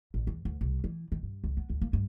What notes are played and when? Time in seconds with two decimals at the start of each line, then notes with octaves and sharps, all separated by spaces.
0.14 A1
0.27 E2
0.45 D2
0.61 C2
0.84 E3
1.12 D#3
1.23 G2
1.44 C#2
1.57 B3
1.70 D2
1.82 A#3
1.93 G2